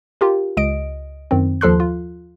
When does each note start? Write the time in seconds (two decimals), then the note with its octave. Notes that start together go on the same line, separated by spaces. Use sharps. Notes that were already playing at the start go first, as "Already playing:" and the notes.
0.21 F4 G4 A#4
0.57 C#2 D#5 D7
1.31 F#2 D#3 C4
1.61 D#2 F3 A4 C6 F#6
1.80 F4